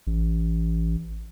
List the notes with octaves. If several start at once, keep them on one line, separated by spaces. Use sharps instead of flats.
A1